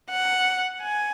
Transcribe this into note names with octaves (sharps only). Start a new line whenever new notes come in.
F#5
G#5